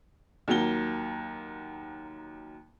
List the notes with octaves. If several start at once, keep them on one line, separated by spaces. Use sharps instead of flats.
D#2 F#3 A#3 G7